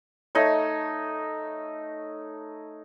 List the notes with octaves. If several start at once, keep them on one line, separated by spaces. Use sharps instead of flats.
A3 D#4 C#5